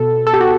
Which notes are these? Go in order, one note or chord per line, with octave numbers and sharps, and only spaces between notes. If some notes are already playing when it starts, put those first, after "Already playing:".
Already playing: B2 A4
A4
G4
F#4